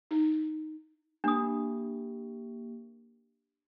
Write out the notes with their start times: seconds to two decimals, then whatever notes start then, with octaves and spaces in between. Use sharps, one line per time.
0.11 D#4
1.24 A#3 D4 G4 D#6